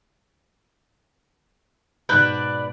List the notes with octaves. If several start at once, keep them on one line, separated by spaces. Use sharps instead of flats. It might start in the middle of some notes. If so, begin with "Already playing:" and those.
G#2 B2 D4 B4 F#6 G6